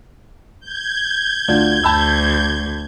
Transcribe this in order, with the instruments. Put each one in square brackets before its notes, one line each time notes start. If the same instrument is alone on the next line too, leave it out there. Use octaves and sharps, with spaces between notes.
[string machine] G6 G#6
[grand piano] D2 D4 F4
[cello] D2 [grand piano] A5 B5 E6